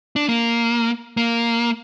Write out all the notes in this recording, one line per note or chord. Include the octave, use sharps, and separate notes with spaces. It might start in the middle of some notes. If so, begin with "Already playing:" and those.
D4
A#3
A#3